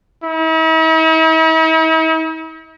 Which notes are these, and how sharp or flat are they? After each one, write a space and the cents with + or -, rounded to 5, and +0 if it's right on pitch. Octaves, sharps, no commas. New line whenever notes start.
E4 -45